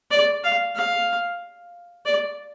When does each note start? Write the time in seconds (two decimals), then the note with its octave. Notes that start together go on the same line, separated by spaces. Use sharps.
0.11 D5
0.44 F5
0.75 F5
2.05 D5